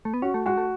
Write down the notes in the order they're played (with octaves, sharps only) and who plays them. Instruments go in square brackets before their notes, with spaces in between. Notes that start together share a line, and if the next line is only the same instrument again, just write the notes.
[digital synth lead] A3
B3
[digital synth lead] C#4 [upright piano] F#4
[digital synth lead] A3
[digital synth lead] G#3 [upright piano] F#4
[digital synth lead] A3